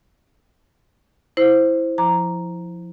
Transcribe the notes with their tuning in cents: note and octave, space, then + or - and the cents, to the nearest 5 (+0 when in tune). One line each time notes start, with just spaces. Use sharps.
E4 +0 C5 +0
F3 +0 A#5 +0 D6 +0